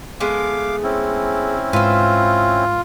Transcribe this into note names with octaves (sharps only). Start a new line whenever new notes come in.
G#3 A3 B3 F5 D6
C4 C#4 E4
G#2 F4 B4 C5